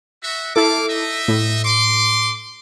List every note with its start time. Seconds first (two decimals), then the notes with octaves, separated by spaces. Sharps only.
0.23 F#4 E5
0.56 A#3 E4 A4 F5 D6
0.89 D#4 D#5 E5
1.28 A2
1.65 C6 D6